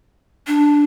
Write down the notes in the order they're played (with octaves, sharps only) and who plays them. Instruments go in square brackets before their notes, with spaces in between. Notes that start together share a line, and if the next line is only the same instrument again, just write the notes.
[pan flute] D4